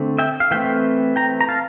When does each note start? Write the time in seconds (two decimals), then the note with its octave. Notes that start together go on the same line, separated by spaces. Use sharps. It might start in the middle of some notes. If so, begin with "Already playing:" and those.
Already playing: D3 A3 C4
0.19 E5 G5
0.40 F5
0.51 E3 A3 C4 E5 G5
1.16 G5 A#5
1.41 A#5
1.49 F5 A5